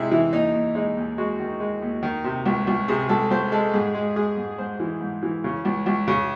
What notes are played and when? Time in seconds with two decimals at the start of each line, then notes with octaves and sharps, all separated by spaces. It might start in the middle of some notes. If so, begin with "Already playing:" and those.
Already playing: C3 G#3 E4 G#4
0.11 E3 E4
0.32 D#2 D#4
0.54 D#2
0.75 G#3 D#4
0.97 D#2
1.18 G#3 F#4
1.40 D#3
1.60 G#3
1.82 D#2
2.03 D#3
2.24 C3
2.46 C#2
2.67 C#2
2.88 C3 G#4
3.09 C#2 A4
3.30 C#2 C5
3.52 G#3 A4
3.74 G#2 G#4
3.95 G#3
4.16 G#3 G#4
4.37 G#2
4.58 G#2 C5
4.80 E3
5.01 G#2
5.23 E3
5.44 C#3
5.65 C#2
5.86 C#2
6.08 C#3